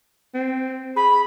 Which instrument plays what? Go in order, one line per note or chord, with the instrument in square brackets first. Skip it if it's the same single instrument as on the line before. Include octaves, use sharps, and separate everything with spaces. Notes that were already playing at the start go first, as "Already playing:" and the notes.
[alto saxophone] C4
[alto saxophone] G#4 [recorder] B5